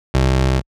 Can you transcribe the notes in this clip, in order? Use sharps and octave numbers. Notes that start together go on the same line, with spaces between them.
C2